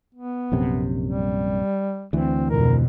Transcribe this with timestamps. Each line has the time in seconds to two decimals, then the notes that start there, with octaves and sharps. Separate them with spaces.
0.14 B3
0.52 A#1 F#2 C3
1.07 G3
2.13 D2 E3 C4
2.50 F2 B2 A#4